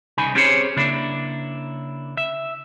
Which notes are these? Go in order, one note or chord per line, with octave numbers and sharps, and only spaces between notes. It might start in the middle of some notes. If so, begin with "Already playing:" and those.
C2 C#3 D#4 G#5 B5
C4 C#4 G4 G#4 C5 C#5
C#3 A#3 D4 E4
E5